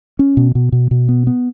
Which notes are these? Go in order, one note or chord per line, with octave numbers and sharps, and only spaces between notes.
C#4
B2
B2
B2
B2
B3
B3